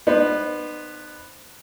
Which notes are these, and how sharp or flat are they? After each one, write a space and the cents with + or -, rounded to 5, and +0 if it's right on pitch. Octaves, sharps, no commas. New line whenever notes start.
B3 +0 D#4 -45 C5 +0